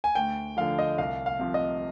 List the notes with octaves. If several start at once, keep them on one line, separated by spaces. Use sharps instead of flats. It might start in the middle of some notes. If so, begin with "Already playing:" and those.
G#5
D2 G5
D3 F3 F5
D#5
C2 F5
F5
C3 F3
D#5